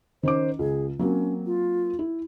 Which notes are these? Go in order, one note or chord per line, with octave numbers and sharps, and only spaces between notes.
D#3 C#4 C5 D6
C#2 G#4
F#3 A#3 C4 C#4
F4
E4